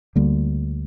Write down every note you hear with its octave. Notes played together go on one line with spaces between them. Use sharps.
D2 D3 G3 A#3